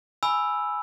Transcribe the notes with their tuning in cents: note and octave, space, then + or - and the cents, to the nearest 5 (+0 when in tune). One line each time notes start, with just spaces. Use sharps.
G#5 +5 B5 +0 E6 +0